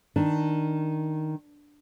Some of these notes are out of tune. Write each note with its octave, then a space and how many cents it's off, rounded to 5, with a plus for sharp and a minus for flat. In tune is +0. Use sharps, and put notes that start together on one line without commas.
D#3 +0 D4 +5